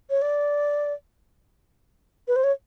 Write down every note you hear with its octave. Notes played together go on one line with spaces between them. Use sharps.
C#5
D5
B4
C5
C#5